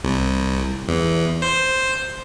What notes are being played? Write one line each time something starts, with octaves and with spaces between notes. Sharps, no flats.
C2
E2
C5